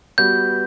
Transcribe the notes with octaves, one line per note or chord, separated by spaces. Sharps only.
G3 B3 F#4 B4 G6